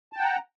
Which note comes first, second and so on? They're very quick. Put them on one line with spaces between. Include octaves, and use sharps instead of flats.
A5 G5 F#5 A#5